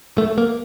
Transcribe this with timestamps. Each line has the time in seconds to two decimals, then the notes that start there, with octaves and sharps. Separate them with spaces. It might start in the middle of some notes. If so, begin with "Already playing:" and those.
0.18 A3
0.38 A#3